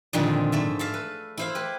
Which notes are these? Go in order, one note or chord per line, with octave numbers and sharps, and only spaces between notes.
F2 A#2 D3 D#3 G#3 F4
G#2 A3 E5
A4 E5 F5
B4
E4 C5 F5
G4 B4